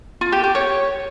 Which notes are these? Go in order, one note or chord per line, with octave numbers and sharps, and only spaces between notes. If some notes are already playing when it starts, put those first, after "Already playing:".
F4
G4
G4
C#5